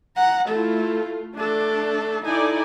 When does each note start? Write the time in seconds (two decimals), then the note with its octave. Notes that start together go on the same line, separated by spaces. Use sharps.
0.16 F#5 A#5
0.48 A3 E4 F4 A4
1.35 A3 D4 A4
2.24 D#4 E4 A4 D5 G#5